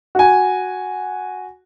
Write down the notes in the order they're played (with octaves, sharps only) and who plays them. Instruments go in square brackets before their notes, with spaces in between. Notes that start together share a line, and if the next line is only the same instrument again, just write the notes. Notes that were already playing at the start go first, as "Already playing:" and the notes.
[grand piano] F#4 G#5